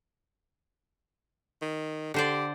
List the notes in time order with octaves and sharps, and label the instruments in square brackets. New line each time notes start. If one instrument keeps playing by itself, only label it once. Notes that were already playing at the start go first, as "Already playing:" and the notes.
[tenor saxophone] D#3
[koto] D3 C5 D5 [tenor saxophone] G4